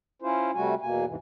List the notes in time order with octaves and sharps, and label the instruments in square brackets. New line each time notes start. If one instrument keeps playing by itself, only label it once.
[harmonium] C#4 E4 F4 C5
C3 G3 A3 F#4 G#5
E2 B2 A#3 G#5
D#2 G#2 C3 E3